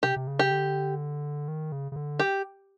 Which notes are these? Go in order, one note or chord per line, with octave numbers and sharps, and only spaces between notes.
C3 G4
C3
C#3
G4
D3
D#3
C#3
C#3
D3
G4